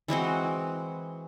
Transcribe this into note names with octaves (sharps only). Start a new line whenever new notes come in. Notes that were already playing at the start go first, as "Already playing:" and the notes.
E3 G#3 C4 F#4